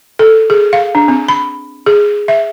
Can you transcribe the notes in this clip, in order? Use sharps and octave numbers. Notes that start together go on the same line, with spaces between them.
A4
G#4
F5
D4
C4
B5
G#4
E5